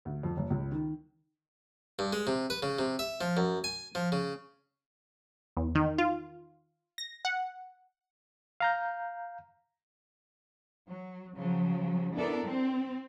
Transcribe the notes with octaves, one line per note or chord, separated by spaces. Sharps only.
D2
F2
F#1
C#2
D#3
G2
G#3
C3
B4
C#3
C3
E5
F3
F#2
G#5
F3
C#3
E2
D#3
F4
A#6
F#5
F5 A#5 G6
F#3
C#3 F3 F#3
B3 D4 E4 A4 A#4 D5
C4